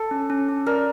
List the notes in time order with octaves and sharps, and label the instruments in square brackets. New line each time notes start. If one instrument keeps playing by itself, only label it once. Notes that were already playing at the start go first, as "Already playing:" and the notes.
Already playing: [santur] A4
[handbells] C#4
C#4
C#4
[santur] A#4 [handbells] D5